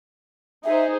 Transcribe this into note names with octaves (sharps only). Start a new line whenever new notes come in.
D#4 G#4 C5 E5